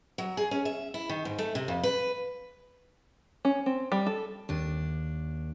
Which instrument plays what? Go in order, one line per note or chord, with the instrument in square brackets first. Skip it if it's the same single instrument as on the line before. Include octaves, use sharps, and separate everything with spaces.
[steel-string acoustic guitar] F#3
G#4
C#4
E5
E4
D#3
G#2
A3
C3
F2
B4
[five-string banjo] C#4
C4
G3
A4
[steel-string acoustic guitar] D#2 D4